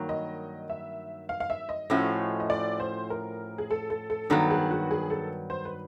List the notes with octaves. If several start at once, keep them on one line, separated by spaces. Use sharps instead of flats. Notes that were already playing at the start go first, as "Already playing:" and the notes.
Already playing: G2 D#3 F#3 A#3
D#5
E5
F5
F5
E5
D#5
A2 F3 A3 C#4 F#4
D#5
D5
C5
A#4
G#4
A4
A4
A4
G2 D#3 F#3 B3 A4
G#4
F#4
G#4
A4
C5
B4